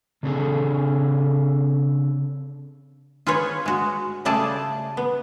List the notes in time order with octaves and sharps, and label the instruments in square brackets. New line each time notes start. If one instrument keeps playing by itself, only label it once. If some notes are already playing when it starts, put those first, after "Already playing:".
[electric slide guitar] C#3 C4 D4 E4 G#4 A4
[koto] F4 G#4 B4 C#5
G#3 F#4
C#3 G3 A3 G#4 D5 A5
B3